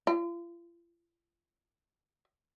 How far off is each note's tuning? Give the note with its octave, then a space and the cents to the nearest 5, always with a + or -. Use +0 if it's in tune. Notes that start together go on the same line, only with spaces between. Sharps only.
F4 -40